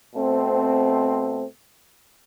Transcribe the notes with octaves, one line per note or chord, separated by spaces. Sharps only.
B2 A3 C4